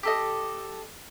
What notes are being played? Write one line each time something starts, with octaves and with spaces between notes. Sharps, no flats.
G4 A4 D#5